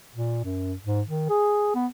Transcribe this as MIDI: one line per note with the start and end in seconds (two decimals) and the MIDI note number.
0.15 0.43 46
0.44 0.73 42
0.84 1.01 44
1.07 1.29 51
1.29 1.73 68
1.75 1.87 59